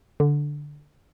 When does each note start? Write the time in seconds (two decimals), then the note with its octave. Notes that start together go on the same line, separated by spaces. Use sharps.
0.20 D3